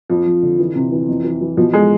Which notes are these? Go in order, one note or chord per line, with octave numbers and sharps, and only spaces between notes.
F2 F3
F2
D3
E3
C3
E3
F2
E3
E3
B2 F3
G#3